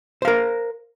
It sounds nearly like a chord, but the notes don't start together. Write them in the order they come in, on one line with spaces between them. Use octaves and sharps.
C5 F5 A#4